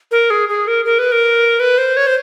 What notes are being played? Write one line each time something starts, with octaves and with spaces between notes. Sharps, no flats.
A#4
G#4
G#4
A#4
A#4
B4
A#4
B4
C5
C#5
C5